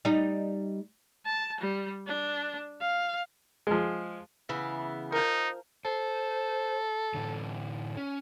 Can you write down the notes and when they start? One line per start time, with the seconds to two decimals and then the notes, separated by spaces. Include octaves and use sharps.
0.05 G3 D#4
1.25 A5
1.60 G3
2.07 D4
2.81 F5
3.67 F3 G#3
4.49 C#3 E3 B3
5.12 F3 D#4 A#4
5.85 A4 C5
7.14 A2 D3 E3
7.97 C#4